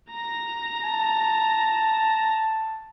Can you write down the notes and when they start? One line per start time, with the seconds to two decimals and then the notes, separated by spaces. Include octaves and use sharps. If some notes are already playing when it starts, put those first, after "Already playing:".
0.11 A#5 A#6
0.84 A5